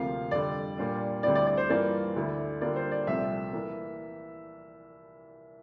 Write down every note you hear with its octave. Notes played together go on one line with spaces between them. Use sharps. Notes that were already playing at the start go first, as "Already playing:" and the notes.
Already playing: D2 C3 F3 A#3 F4 F5
F2 D3 G3 D5
A#2 G3 A#3 D4 F4
D2 D3 G3 C4 E4 D5
D5
D5
C5
G2 E3 A#3 F4 D5
D2 D3 A3 E4
D3 G3 A#3 F4 D5
C5
D5
C2 A#2 F3 A3 C4 E5
E3 A#3